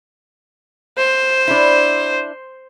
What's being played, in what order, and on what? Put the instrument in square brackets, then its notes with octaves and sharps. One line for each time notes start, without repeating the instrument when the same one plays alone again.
[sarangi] C5
[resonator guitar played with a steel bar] D4 E4